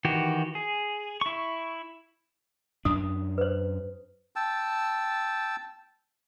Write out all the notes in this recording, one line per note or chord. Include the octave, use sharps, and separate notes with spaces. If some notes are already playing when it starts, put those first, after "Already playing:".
D#3 E3 F#4 G4
G#4
E4 C#6
F#2 D4 D#6
B4 C5
G5 A5 E6